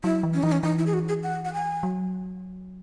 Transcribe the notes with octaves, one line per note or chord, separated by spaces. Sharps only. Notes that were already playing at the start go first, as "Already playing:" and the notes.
F#3 E4
E3
C#4
E3 D#4
C#4
E3 D#4
E4
G#4
F#4
G#4
F#5
F#5
G#5
F#3